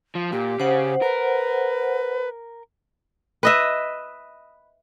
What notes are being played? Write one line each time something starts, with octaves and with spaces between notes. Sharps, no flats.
F3
A#2 G4
C#3 C5 F#5
A#4 B4
B4 D#5 E5